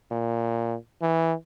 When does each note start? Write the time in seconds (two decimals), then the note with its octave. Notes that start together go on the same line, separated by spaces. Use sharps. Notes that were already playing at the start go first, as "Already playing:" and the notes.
0.11 A#2
1.02 E3